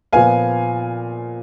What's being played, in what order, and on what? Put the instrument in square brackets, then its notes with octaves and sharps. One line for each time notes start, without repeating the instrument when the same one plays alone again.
[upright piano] A#2 F3 B3 F5 G#5